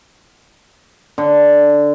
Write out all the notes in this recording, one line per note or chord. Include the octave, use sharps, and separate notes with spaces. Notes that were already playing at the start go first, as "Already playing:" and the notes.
D3